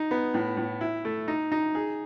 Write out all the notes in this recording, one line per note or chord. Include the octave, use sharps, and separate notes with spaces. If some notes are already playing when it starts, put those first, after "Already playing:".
Already playing: D#4
B3
A2
A2
E4
A3
D#4
D#4
G#4